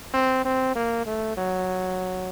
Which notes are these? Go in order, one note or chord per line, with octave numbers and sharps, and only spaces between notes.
C4
C4
A#3
A3
F#3